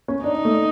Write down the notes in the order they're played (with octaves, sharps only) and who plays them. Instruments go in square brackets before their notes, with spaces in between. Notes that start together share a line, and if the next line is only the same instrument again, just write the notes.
[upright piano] C#4
[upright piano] D4 [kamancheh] D#4
[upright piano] A3